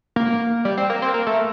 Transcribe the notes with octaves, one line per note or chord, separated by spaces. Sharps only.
A#3
G3
C4
A#3
C4
A#3
A3